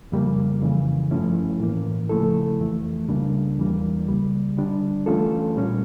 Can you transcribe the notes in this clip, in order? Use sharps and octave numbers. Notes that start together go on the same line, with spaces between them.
F2 C#3 G3 A#3
F2 C#3 E3
G2 F3 A3 C#4 E4
A2 E3 A#3
C#3 F3 A3 E4 A4
F2 E3 A3
C#2 C#3 G3 A#3 D4
E2 E3 G3 A#3
C#2 C#3 G3
D3 G3 D4
E3 A3 C#4 F4 A4
A#2 G3 C#4